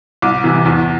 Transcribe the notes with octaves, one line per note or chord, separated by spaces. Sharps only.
C2 D6
C3 E3
E2